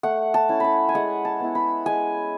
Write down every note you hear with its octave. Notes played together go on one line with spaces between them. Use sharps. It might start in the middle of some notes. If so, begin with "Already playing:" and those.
A3 F#5
A5
C#4 E4
A5 B5
G#5
G#3 F#5
A5
B3 E4
B5
G#3 G#5